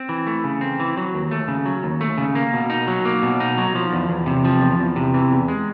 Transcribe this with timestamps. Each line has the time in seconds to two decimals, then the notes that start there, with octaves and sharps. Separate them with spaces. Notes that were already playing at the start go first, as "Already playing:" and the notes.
Already playing: C4
0.09 E3
0.27 A3
0.44 C#3
0.61 C4
0.80 E3
0.97 F#3
1.14 D#2
1.31 A3
1.48 C#3
1.66 F#3
1.83 D#2
2.01 A3
2.18 C#3
2.35 A#3
2.53 B2
2.70 D#4
2.87 F#3
3.05 A#3
3.23 B2
3.40 D#4
3.58 F#3
3.75 F3
3.93 E2
4.09 E2
4.26 C3
4.45 F3
4.61 E2
4.79 E2
4.96 C3
5.14 E3
5.31 E2
5.48 G#3